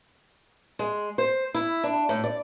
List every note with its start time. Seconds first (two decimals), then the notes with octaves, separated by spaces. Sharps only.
0.79 G#3
1.18 C5
1.54 E4
1.84 D4
2.09 A2
2.24 D5